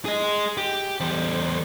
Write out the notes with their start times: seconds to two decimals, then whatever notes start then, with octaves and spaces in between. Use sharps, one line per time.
0.05 G#4 D#5
0.57 G4
1.00 E2 C5